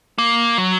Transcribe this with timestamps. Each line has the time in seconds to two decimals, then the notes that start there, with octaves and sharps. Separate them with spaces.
0.18 A#3
0.58 F#3